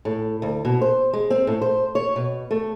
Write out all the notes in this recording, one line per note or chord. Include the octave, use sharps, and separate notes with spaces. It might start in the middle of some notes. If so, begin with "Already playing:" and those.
A2
D2
B2
C5
G#3
C4
A2
C5
C#5
B2
A3